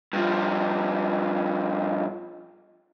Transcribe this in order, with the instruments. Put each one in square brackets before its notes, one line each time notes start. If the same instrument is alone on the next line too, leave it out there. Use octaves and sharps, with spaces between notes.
[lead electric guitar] G2 F3